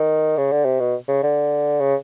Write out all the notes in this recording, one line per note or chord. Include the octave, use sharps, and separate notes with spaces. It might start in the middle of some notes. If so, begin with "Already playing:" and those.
Already playing: D#3
C#3
D3
C3
B2
C#3
D3
C#3